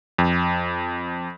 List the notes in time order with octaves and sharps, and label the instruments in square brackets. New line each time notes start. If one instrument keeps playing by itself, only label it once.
[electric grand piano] F2